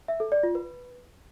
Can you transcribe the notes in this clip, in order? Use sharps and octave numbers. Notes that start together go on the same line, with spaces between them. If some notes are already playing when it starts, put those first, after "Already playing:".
E5
A4
D5
F4
B4